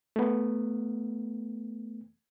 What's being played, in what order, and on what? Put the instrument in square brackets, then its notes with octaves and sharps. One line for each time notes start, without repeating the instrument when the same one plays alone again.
[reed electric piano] A3 B3